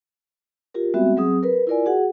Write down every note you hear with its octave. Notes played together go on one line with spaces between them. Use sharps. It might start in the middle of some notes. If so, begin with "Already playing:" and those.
F4 G4 A#4
G3 G#3 B3 C4 F#4 E5
F#3 C4 G#4 D#6
A#4 B4
E4 F4 A#4 D5 G#5
F#4 G#4 F#5